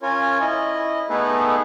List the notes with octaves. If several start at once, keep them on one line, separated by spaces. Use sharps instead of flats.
C#4 F4 A#4 C#5 G#5
E4 D#5
A3 B3 D#4 G#4 A4 B4